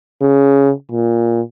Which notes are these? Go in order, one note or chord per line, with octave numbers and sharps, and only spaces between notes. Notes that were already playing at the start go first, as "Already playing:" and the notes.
C#3
A#2